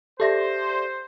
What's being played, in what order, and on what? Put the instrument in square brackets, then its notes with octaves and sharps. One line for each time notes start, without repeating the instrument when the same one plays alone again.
[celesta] G4 E5 A#6 [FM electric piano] A4 D5 [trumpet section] C5